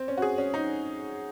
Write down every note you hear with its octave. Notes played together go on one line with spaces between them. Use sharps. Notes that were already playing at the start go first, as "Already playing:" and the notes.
Already playing: C4
C#4
F#4
G#4
C#4
D#4